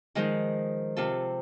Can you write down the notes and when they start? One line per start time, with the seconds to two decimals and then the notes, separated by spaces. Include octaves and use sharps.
0.15 D#3 F3 G#3 D#4 C5
0.97 C3 F4 A4